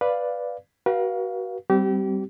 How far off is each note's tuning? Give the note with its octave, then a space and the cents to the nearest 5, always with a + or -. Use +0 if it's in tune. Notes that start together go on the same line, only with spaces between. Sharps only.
B4 +0 D5 +0 F5 +0
F#4 +30 B4 -40 F5 +0
G3 +0 C4 +0 G4 -30